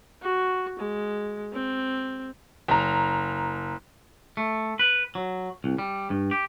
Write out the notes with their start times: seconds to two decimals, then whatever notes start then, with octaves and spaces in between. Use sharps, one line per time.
0.22 F#4
0.79 G#3
1.53 C4
2.68 F#1 A#5
4.37 A3
4.79 B4
5.15 F#3
5.64 C2
5.78 G3
6.10 G2
6.31 G4